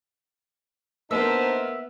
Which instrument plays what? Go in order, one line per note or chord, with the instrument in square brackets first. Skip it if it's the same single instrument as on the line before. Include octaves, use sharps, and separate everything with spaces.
[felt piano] A#3 A#4 [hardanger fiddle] B3 [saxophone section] D4 D#4 C5 [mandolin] E5